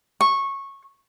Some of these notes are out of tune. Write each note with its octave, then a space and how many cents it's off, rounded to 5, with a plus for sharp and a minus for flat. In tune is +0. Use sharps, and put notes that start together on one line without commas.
C#6 -15